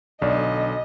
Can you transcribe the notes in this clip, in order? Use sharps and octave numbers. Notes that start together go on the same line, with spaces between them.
B1 D3 D5 D#5